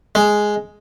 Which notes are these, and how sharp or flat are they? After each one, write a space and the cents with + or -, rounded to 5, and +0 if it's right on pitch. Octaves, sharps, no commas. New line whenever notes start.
G#3 +5